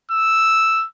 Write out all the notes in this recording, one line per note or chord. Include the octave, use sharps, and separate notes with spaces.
E6